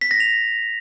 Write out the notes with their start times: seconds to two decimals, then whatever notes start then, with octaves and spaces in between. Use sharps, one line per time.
0.01 B6
0.11 A#6
0.20 F7